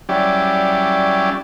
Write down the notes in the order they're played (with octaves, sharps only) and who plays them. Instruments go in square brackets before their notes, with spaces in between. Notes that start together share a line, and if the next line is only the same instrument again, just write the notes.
[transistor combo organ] F#3 G3 C#4 E4 G4 D5